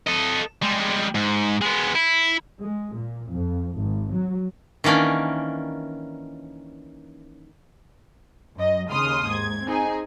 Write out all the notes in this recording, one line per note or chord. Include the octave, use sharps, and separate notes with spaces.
A4 D#5
G3 G#3
G#2
G#3 B3
E4
G#3
A#2
F2
G#1
F#3
D#3 E3 A#3 C#4 D4
F#2 D#5
D#2 C#3 C6 D#6 F6
G#2 G#6
C4 D#4 G#4 G#5